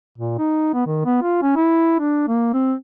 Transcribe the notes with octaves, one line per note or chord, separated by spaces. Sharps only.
A#2
D#4
B3
D#3
B3
F4
C#4
E4
D4
A#3
C4